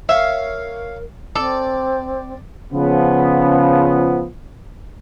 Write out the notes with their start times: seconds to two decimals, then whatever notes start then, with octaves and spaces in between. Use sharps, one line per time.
0.09 A#4 C#5 E5 F5
1.35 C4 A4 D5
2.73 C#3 F3 B3